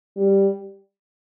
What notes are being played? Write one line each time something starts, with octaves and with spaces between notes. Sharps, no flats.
G3